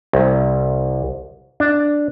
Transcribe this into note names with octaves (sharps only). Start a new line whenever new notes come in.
C2
D4